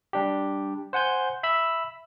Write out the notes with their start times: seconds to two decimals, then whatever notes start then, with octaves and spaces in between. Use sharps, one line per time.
0.13 G3 D4 G4
0.93 C5 F#5 G#5 G6
1.43 E5 B5 E6